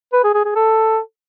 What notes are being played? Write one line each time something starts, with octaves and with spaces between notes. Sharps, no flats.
B4
G#4
G#4
G#4
A4